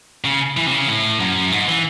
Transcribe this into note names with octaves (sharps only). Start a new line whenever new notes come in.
C#3
E3
C3
C#3
A2
F#2
G#2
E3